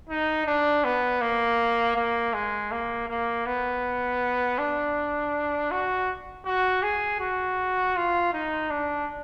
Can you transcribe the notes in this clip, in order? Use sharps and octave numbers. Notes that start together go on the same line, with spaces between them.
D#4
D4
B3
A#3
A#3
G#3
A#3
A#3
B3
D4
F#4
F#4
G#4
F#4
F4
D#4
D4